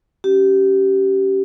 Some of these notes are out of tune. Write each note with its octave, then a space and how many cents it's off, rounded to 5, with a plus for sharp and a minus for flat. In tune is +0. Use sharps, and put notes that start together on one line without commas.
C#4 +0 G4 -20